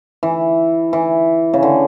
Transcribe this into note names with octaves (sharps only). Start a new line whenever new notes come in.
E3
E3
C#3
D3